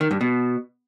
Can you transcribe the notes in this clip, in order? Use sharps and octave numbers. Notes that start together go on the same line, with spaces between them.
D#3
G2
B2